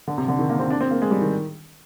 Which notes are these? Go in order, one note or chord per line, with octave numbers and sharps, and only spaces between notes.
D3
C3
D3
D#3
A#3
C4
D4
C4
A#3
G#3
G3
D#3